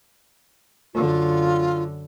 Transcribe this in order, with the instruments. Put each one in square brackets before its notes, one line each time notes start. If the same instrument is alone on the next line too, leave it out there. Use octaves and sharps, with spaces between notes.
[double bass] F#2 D3 [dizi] F4